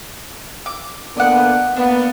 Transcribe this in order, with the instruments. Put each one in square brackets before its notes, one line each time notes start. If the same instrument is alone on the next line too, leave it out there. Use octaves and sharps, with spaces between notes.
[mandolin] D6
[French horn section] D3 A#3 B3 [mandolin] D5 D#5 F#5
[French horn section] A#3 B3 [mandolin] D4